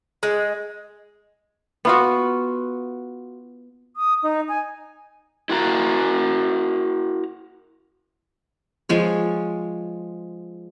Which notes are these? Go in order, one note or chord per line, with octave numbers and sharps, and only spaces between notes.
G#3
B3 F4 F#4
D#6
D#4
G#5
E4 F#4 A#4 A#5
F3 G#3 C#5